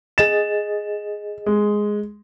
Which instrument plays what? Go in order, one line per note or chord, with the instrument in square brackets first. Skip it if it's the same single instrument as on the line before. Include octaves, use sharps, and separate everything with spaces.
[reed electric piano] G#4 D#5 A6 [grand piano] E7
[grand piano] G#3